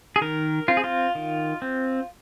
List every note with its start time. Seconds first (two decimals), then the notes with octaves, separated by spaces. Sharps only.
0.16 G#4
0.21 D#3 A#4
0.68 C4 F4
0.77 G#4
0.84 F4
1.15 D#3
1.62 C4